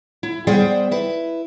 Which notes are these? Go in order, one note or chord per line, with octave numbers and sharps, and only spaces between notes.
E4
G3 B3 G#4 C5 D5 G5
E4 B4